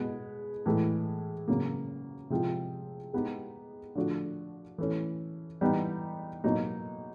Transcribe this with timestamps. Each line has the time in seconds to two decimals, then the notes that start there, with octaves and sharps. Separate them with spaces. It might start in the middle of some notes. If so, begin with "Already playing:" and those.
Already playing: B2 G#3 B3
0.66 A2 E3 G#3
1.48 C#3 F#3 A#3
2.30 C3 F3 G#3 C4 F4
3.13 G#3 B3 D#4 G4
3.95 D3 F3 A3 D4 F#4
4.78 E3 A3 C#4
5.61 E3 G3 B3 D#4
6.44 B2 F#3 A#3 D#4